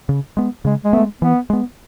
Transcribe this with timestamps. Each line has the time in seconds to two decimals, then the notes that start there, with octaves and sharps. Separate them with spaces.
0.09 C#3
0.37 G#3 B3
0.65 C#3 G#3
0.84 G#3
0.93 A3 B3
0.97 G#3
1.22 E3 B3
1.50 G#3 B3